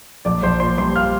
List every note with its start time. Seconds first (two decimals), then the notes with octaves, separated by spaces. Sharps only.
0.25 A#1 D5 D6
0.43 A#1 C5 C6
0.60 A#2 C5 C6
0.77 G3 C5 C6
0.96 F5 F6